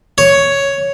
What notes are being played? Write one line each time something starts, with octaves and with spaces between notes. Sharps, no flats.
C#5